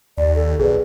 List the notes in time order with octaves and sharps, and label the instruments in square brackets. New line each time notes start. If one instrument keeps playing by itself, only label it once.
[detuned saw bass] D#2 [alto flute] D5
[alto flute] A4
[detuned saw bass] B1 [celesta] G#4 B4 D5